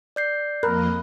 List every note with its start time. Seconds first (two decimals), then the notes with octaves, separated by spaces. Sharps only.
0.16 D5 G6 C7
0.63 F2 A#3 A#4 D#5 B5 F#6